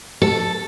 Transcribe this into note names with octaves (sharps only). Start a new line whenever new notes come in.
A4